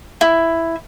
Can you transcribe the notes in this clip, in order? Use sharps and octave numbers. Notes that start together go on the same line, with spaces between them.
E4